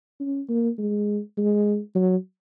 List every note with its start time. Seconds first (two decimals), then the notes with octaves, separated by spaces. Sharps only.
0.20 C#4
0.49 A#3
0.78 G#3
1.38 G#3
1.96 F#3